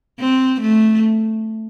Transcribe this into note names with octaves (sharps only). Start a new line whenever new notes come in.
C4
A3